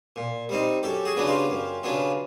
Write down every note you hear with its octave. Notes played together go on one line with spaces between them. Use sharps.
A#2
G3 C4 D#4
F#2 G4 A4
F#4 G#4
C#3 F#3 B3 D4
F4 G4
F#2
C#3 F#3 B3 D4